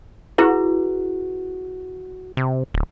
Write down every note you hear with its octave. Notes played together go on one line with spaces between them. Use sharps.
E4 F#4 G#4 B4
C3
D1